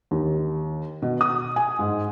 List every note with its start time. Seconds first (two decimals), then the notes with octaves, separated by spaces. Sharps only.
0.11 D#2
1.02 B2
1.21 D#6
1.56 G#5
1.79 G#2